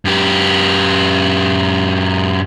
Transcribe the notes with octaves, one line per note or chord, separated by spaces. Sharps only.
F#2 G4